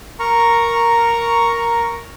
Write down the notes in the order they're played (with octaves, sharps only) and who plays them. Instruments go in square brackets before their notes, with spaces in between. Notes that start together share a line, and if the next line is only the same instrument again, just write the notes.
[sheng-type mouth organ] A#4 A#5 C#6